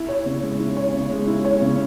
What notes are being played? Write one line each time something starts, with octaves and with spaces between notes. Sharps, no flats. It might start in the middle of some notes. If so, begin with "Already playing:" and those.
Already playing: E4
C#5
C#3
G#3
E4
C#5
C#3
G#3
E4
C#5
C#3